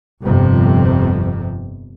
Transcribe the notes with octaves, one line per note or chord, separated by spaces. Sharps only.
G1 F2 C3